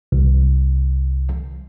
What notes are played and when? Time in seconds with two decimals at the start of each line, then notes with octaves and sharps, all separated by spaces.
0.12 C2